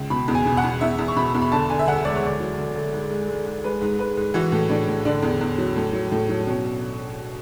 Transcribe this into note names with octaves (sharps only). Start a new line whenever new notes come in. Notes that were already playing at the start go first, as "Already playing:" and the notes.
Already playing: C#2
B2 B5
E2
G#5
B2
F#5
E2
E2 E5
E2
C#6
B2 B5
E2
B5
D3 A5
D3 G#5
E5
D2 F#5
G#3 D5
C#5
D2 D5
F#3
D2
D2
G#2
G#3
G#3
G#2
G#3 B4
G#2
G#2 B4
G#2
E3 F#4
A2
A2 D4
A2
D3 D4
E2
E2
F#3
A2
F#3
A2
F#3
B2 C#4